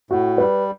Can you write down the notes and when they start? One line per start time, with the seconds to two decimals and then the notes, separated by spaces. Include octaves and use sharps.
0.11 A2 F#4
0.38 G3 B4